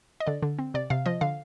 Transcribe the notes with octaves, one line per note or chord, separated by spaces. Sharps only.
D#5
D3 D5
D3
C4
C3 D5
C3 F5
F3 D#5
D3 F5